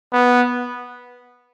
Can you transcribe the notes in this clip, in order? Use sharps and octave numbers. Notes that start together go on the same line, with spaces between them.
B3